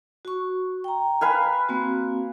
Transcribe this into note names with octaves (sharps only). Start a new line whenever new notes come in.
F#4 C#6
G5 A#5
B4 F5 G#5
A#3 C4 F#4